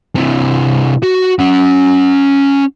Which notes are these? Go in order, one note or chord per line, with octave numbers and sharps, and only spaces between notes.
C3 E3
F#4
C#4 F#5